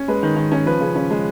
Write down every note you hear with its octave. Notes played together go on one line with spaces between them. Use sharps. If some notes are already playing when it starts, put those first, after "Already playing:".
Already playing: C#4
G#3 B4
D#3
D#3
C#4
F3 B4
C#3
C#4
G#3